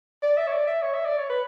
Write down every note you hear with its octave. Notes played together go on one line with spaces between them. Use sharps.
D5
E5
C#5
D5
E5
C#5
E5
D5
C#5
B4